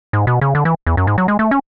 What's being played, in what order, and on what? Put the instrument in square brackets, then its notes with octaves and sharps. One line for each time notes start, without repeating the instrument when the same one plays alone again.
[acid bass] G#2
B2
C#3
D3
E3
E2
F#2
G#2
F#3
G#3
A3
C#4